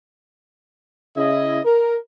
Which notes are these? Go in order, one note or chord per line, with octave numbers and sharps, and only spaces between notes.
C#3 E4 D#5
A#4